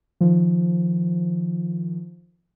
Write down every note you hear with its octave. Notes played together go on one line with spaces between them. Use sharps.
D#3 F3